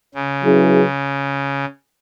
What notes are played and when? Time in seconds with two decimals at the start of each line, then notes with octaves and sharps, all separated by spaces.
0.15 C#3
0.43 F#3 C#4 E4 G#4 B4